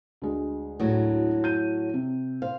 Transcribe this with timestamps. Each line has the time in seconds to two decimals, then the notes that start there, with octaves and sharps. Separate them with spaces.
0.22 D2 G#3
0.80 A2 F#3
1.44 G6 D#7
1.94 C3
2.42 C5 F5